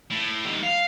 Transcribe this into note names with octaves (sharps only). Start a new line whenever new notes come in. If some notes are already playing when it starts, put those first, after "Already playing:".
A2
D#3 G3
F5